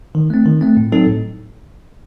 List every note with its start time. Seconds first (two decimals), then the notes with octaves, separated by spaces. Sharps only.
0.15 D#3
0.30 A3 C4
0.46 D#3
0.61 A3 C4
0.77 A2
0.92 F#3 C4 D#4 A4
1.07 A2